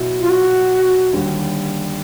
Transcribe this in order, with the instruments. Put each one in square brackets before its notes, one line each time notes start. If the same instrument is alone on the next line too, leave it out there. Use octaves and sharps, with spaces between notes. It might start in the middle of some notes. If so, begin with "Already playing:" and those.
Already playing: [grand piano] B2 F#3 B3 E4
[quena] F4
F#4
[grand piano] D#2 D3 G3